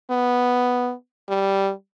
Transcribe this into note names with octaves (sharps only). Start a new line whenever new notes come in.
B3
G3